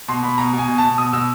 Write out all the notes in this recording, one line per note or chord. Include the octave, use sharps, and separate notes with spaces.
B2 C6
B2 B5
B2 A#5
B2
G#5
B2
B2 A5
B2 D#6
B2 E6